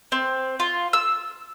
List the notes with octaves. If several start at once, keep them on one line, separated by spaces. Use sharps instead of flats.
C4
F4
E6